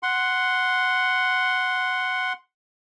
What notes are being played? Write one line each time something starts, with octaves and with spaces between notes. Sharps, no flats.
F#5 C6